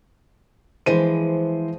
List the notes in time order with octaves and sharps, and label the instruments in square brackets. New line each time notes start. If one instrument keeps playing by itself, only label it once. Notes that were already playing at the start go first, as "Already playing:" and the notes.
[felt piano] E3 C5 D#7 [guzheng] F3 G#3 B4